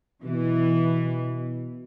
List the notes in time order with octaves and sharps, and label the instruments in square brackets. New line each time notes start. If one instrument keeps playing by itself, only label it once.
[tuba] B2 [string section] E3